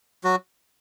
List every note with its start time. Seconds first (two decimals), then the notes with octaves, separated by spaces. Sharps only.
0.24 F#3 F#4